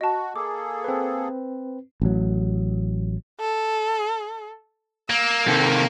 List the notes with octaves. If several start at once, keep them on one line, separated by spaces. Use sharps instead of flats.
F#4 D#5 A5
A#3 G#4 A4 D6
C4 B4
A1 F#3
A4
A#3 E6
C3 D#3 A4